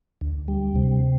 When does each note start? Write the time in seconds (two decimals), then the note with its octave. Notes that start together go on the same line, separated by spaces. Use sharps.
0.21 D2
0.48 G3
0.76 C3